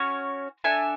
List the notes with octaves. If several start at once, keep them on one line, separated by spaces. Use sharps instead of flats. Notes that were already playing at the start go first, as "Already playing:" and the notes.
Already playing: C#4 F#4 C#5
D4 A4 E5 G#5